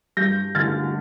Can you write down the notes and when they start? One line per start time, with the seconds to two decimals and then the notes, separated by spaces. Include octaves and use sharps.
0.17 G2 G6 A#6
0.55 D3 A3 F6 A6